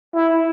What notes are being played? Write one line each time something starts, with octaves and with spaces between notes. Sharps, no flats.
E4